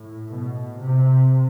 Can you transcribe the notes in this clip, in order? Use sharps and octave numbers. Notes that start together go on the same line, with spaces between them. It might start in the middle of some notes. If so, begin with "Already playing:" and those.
Already playing: A2
B2
C3